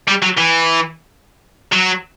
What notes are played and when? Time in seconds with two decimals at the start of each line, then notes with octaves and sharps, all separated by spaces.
0.08 G3
0.22 F#3
0.38 E3
1.73 F#3